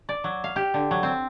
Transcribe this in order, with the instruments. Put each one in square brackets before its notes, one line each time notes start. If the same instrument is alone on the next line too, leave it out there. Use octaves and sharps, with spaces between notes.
[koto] D5
F#3
F5
G4
D3
F#3
C4